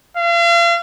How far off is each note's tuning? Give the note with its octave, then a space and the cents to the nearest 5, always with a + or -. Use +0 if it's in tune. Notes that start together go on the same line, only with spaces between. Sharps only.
F5 -40